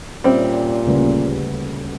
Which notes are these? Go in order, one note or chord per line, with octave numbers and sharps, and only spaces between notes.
A#2 G3 C4 C#4 E5
D#1 D2 C#3 B4